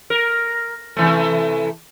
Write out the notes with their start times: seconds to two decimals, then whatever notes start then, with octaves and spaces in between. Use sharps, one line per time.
0.10 A#4
0.96 C3 E3 A3